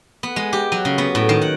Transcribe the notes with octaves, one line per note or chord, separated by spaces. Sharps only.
B3
G#3
G4
F#3
C#3
B3
A2
D#3
F#5